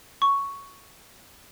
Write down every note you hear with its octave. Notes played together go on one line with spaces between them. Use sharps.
C#6